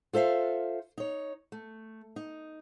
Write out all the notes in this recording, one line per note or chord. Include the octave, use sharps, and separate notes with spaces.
F4 A4 C5 E5 F5
D#4 C#5
A3
D#4